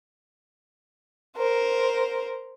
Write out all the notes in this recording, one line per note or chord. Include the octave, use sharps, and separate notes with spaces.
A#4 C5